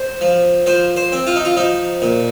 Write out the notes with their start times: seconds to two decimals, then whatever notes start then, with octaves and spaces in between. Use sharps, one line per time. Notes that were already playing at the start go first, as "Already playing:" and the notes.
Already playing: C5
0.21 F3
0.66 F3 C5
0.97 C5
1.12 C4
1.27 F4
1.36 D#4
1.45 F4
1.57 F3 D#4
2.02 A#2